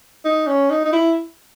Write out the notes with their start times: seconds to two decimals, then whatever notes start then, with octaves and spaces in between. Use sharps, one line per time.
0.25 D#4
0.47 C#4
0.70 D#4
0.85 D#4
0.92 E4